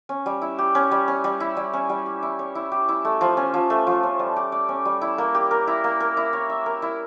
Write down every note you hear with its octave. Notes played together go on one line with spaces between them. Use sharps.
C#4
G3
E4
G4
C#4
G3
C#4
G3
E4
G3
C#4
G3
G4
E4
C#5
E4
G4
E4
A3
F3
C#4
F3
A3
F3
C#4
G3
G4
D5
C#4
G3
E4
A#3
G4
A#4
E4
A#3
A#4
E4
C#5
E5
A#4
E4